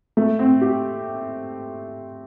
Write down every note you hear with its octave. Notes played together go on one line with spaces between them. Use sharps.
A3
C4
G4